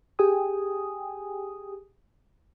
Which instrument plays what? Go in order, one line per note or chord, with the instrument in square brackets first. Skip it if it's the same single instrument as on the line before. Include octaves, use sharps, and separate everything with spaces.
[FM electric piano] G4 G#4 G5 G#5 D#6